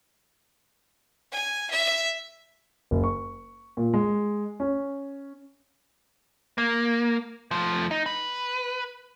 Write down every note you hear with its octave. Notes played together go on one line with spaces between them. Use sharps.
G#5
E5
F#1
C#6
A#2
G#3
C#4
A#3
F3 A3
D#4
B4